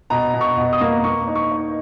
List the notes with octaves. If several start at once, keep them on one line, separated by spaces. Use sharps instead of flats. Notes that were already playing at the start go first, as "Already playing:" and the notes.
B2 A#5
B2
C#6
B2
D#6
A#3
A#3 C#6
D#4
C#6
D#4